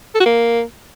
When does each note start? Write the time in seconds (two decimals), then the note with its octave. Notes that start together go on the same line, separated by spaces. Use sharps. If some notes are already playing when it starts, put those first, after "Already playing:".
0.15 A4
0.20 F#4
0.26 A#3